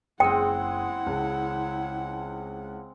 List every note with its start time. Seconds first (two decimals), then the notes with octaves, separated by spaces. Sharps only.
0.20 F#1 G#3 C4 E4 G#4 F#5 G5 D#7
1.06 C#2 C#3 A5